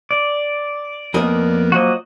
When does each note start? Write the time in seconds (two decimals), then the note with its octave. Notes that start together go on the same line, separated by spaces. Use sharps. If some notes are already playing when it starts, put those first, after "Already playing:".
0.11 D5
1.14 F2 A#3 B3 A#4 D#5
1.72 F3 F#3 A#3 F#4 D#5